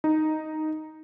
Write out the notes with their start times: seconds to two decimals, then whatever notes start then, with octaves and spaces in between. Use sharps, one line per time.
0.04 D#4